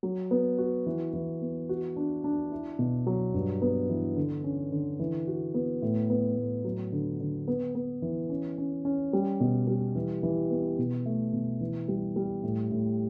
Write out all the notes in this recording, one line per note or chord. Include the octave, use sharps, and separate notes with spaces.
F#3
B3
F#4
E3
E3
B3
F#4
D4
D4
E4
B2
F#3
G2
B3
E3
D3
C#4
D3
E3
F#4
B3
A2
B3
A2
F#3
D3
D3
B3
B3
E3
C#4
C#4
C#4
G3
B2
G3
E3
E3
B3
B2
A3
B2
E3
G3
G3
A2
A2